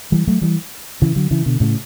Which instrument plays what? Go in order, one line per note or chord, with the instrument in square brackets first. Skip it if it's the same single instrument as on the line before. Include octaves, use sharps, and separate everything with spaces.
[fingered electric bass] E3 G3
F#3 A3
E3 G3
C#3 E3
D3 F#3
C#3 E3
B2 D3
A2 C#3